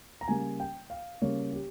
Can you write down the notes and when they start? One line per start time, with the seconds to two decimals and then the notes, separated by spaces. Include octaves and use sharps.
0.21 A#5
0.28 C#3 G3 A#3 G#5
0.60 G5
0.90 F5
1.22 C#3 G3 A#3 C#5
1.53 G4